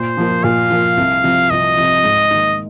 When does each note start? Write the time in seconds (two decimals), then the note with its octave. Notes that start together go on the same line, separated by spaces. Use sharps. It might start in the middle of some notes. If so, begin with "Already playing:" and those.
Already playing: A#2 C5
0.17 F3 A#3 F4
0.44 A#2 F5
0.70 F3 A#3 F4
0.97 C2
1.24 C3 F3
1.50 C2 D#5
1.77 C3 F3
2.04 G#2
2.31 D#3 A#3 D#4